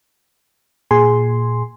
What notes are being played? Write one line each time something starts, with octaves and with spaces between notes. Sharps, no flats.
A#2 G#4 G#5 C6